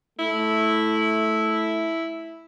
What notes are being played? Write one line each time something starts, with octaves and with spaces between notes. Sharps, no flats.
A3 E4